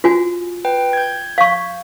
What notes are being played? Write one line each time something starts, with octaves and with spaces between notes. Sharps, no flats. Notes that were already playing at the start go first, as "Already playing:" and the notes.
F4 F#4 G#5
B4 G5
G6 G#6
F5 C#6